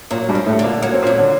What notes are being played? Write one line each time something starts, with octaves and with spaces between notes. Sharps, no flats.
A#2 F#3 A#3
G2 G3
C4
A2 A3
D3
A#2 A#3
F#3 A#3
C4
A#2 A#3
F#3
D3 D4